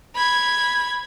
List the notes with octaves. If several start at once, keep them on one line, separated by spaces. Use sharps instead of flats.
B5 G#6